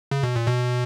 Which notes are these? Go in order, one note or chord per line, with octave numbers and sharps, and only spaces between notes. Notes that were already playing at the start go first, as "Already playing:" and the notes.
C#3
B2
A#2
B2